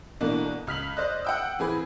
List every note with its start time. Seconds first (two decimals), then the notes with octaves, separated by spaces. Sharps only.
0.20 B2 E3 A3 A#3 D4
0.67 C#2 F6 B6 F#7
0.97 C5 D5 D#5 D#6 F#6
1.25 F#5 G5 E6
1.59 E3 C4 G#4 B4